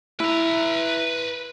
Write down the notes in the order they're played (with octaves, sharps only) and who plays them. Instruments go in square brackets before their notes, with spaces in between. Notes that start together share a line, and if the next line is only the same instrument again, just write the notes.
[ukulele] E4 [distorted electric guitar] B4 A#5